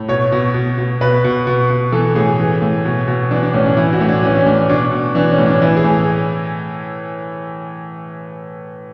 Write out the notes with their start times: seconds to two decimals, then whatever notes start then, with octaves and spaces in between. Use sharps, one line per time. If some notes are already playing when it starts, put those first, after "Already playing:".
Already playing: A2
0.08 B2 C#5
0.32 B2
0.54 B2
0.78 B2
1.01 B2 B4
1.24 B2
1.47 B2
1.70 B2
1.92 E3 A4
2.15 A2 G#4
2.39 E3
2.62 A2
2.85 B2
3.08 B2
3.31 E3 D4
3.43 D4
3.54 A2 C#4
3.65 D4
3.77 E3 E4
3.93 F#4
4.01 A2
4.09 D4
4.23 E3 C#4
4.38 C#4
4.46 A2 D4
4.69 B2 D4
4.92 B2
5.15 E3 D4
5.31 C#4
5.38 A2
5.46 D4
5.61 E3 E4
5.76 G#4
5.84 A2